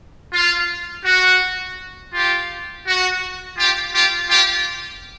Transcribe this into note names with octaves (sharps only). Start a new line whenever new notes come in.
F4
F#4
F4 G4
F#4
F4 G4
F4 G4
F4 G4